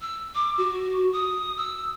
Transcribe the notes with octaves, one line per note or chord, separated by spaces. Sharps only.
E6
D6
F#4
D#6
E6